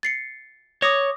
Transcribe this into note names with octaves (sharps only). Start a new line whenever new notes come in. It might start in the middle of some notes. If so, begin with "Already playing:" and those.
A6 C7 C#7
C#5 D6 D#6 A#6